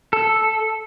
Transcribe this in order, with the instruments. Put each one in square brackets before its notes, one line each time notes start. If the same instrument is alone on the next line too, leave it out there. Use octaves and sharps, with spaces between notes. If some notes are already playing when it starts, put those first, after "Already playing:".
[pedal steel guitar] A4